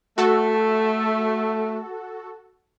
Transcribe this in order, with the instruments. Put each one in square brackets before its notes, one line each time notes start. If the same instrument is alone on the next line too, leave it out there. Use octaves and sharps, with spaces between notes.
[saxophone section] A3 [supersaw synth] F#4 A4